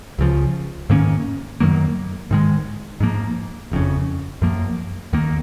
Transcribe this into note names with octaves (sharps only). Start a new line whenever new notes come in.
C#2 C#3 F3
G#2 D#3 A#3 C#4
F#2 D#3 F#3 A#3
G#2 D#3 G#3
G#2 F3 A#3
F#1 F2 C#3
F#2 F3 A#3
D#2 D#3 A#3